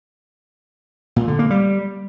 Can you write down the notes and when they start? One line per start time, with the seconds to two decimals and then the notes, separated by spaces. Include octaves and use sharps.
1.16 A#2
1.28 D3
1.39 A#3
1.50 G3